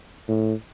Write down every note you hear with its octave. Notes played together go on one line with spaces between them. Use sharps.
A2